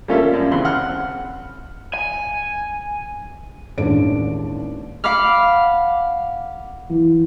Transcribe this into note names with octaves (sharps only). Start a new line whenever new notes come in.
G3 A#3 C#4 F4 A4 E5
F#2
E2 C#3 C4 B5 C6
F#5 F6
G#5
A1 D#2 G#3 D4 D7
F5 F#5 B5 D6 F6
E3